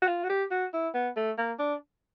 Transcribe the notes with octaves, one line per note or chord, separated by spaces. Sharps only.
F#4
F4
F#4
G4
F#4
E4
B3
A3
A#3
D4